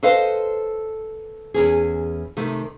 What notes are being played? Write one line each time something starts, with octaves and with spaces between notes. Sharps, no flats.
A4 B4 C5 D#5 F5
E2 C#4 G#4
C3 D#3 A3